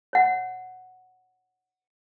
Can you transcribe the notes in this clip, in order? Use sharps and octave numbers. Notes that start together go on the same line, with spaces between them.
C#5 F#5